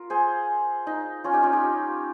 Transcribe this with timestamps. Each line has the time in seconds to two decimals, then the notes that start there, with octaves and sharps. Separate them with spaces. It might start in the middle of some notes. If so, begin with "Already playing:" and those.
Already playing: F4 A#4
0.10 G#4 C5
0.87 D#4
1.24 C#4 F4
1.33 D#4 G4
1.43 C#4 F4
1.53 D#4 G4